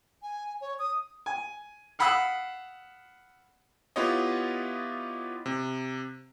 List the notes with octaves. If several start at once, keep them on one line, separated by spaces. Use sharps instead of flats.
G#5
C#5
D#6
G#5
F5 F#5 B5 D#6 E6 F#6
B3 E4 F4 G4 C#5 D#5
C3